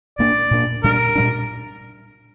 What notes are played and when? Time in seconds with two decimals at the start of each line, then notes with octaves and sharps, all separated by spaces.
0.18 A#2 A#3 D4 D5
0.51 A#2 A#3 D4
0.83 A#2 G3 D4 A#4
1.16 A#2 G3 D4